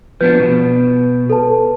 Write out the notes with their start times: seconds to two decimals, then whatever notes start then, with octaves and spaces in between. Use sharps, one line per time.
0.21 F3 B3 D4 B4 G6
0.40 B2
1.30 A4 B4 A5